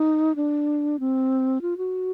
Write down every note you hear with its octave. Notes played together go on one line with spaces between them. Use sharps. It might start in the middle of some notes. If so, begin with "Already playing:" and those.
Already playing: D#4
D4
C4
F4
F#4